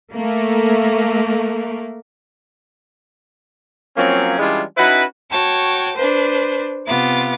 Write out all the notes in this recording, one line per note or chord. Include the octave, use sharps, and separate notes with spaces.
A3 A#3
F3 F#3 A#3 C4 C#4
E3 G3 G#3 C#4 D4 F4
C#4 D#4 E4 F#4 B4
F#4 C#5 G5 A5
D4 B4 C5
C3 B3 F4 D6